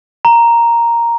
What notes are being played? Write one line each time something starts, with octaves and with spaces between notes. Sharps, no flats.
A#5